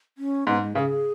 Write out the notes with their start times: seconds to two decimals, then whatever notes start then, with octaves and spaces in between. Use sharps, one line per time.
0.18 C#4
0.47 G#2 B3
0.62 G#3
0.75 C#3 B4
0.79 G#4